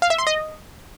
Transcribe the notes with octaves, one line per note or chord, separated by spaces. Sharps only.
F5
E5
C6
D#5